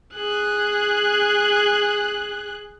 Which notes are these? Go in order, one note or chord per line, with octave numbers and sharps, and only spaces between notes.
G#4 F#6